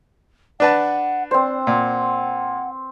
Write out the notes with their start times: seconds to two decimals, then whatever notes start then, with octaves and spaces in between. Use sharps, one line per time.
0.60 D4 B4 F#5 A5
1.31 C4 C5 D5
1.67 A#2 F#5